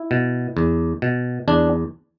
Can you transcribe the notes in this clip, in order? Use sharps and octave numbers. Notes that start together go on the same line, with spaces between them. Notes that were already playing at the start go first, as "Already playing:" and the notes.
Already playing: E4
B2
E2
B2
E2 D4